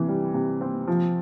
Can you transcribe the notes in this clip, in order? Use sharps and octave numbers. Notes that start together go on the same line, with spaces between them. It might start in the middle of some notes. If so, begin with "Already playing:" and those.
Already playing: C3 E3
G3
C3
C4
F3